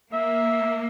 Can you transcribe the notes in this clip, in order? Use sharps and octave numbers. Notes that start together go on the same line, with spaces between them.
A#3 E5